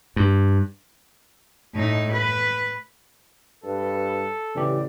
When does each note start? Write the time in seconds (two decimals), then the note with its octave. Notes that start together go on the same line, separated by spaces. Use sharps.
0.16 G2
1.74 A2 D#4
2.12 B4
3.64 G2 A4 B4
4.55 A1 C#3 E3 G4 D5